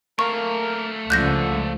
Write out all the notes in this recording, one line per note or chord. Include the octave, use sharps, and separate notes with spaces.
A3 A#3 A#4 F5 C#6
C#2 D3 F3 F#6 G6 A#6